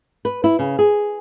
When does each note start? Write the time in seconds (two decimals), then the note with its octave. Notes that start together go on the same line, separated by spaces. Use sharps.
0.25 B4
0.44 E4
0.59 C#3
0.79 G#4